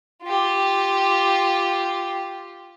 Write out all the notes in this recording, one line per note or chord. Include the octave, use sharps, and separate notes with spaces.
F4 G4